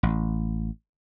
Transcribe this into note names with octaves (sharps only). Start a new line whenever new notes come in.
A1